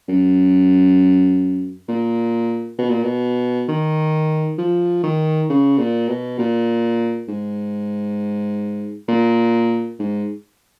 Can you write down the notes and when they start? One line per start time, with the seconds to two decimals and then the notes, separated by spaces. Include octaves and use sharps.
0.08 F#2
1.88 A#2
2.78 B2
2.90 A#2
3.03 B2
3.69 D#3
4.58 F3
5.03 D#3
5.49 C#3
5.79 A#2
6.08 B2
6.39 A#2
7.28 G#2
9.08 A#2
9.99 G#2